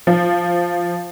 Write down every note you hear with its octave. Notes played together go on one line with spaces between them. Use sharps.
F3